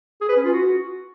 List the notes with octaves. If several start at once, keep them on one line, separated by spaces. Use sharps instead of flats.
G#4
B4
C#4
F4
F#4